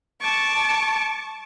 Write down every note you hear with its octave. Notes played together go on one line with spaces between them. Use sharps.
A5 C#6 D6